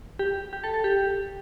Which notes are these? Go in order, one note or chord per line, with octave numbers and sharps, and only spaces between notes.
G4
G4
A4
A4
G4